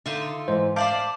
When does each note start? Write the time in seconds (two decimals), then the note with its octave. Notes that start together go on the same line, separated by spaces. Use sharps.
0.06 D3 D#4 F4 E5
0.48 G#2 E3 C5
0.76 C5 D5 E5 F5 A5 D6 G6